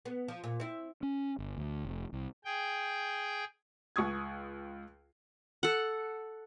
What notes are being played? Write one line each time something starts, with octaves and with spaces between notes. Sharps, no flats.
B3
F3
A#2
C4 E4
C#4
G1
D2
F1
C2
G#4 G5
C#2 C#6 D#6 G#6
A4 F#5